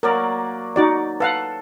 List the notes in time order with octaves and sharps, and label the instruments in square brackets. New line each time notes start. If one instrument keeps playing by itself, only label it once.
[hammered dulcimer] F#3 A#3 D5 [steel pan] A#4
[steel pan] D#4 F#4 D5
[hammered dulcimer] A4 [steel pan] B4 F5 F#5